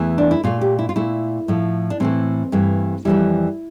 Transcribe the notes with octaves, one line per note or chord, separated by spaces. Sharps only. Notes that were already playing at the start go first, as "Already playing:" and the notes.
Already playing: E2 E3 A3
D4
E4
A#2 A3 F4
G4
E4
F4
A#2 A3 E4
A2 F3 A3
D4
A2 E3 A3 C4
G2 E3 A3
F2 E3 G3 E4